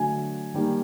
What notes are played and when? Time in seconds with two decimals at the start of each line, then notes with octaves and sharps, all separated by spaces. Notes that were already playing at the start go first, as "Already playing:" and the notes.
Already playing: D3 F#3 A3 G#5
0.54 D#3 G3 A#3